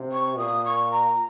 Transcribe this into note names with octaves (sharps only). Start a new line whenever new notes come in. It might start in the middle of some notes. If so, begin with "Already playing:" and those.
Already playing: C3
C#6
A#2 D#6
C#6
A#5